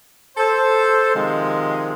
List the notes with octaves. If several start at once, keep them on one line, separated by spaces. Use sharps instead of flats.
A4 C5
C3 D#3 F3 G#3